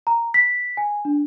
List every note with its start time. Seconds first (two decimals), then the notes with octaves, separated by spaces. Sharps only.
0.07 A#5
0.34 B6
0.77 G#5
1.05 D4